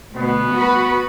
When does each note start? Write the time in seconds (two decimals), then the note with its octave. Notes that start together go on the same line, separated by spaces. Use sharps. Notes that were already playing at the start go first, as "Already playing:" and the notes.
0.15 D2 B2 B3
0.56 F#4 B4